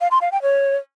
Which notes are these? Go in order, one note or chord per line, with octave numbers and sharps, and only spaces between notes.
F5
C6
F5
G5
C#5